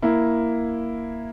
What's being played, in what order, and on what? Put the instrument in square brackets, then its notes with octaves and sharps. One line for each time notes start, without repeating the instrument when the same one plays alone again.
[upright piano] A#3 E4